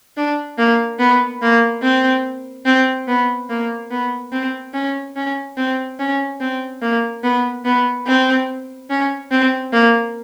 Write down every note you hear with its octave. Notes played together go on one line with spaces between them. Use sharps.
D4
A#3
B3
A#3
C4
C4
B3
A#3
B3
C4
C#4
C#4
C4
C#4
C4
A#3
B3
B3
C4
C#4
C4
A#3